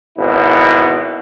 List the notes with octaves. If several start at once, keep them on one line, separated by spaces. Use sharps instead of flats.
G#1 B2 E4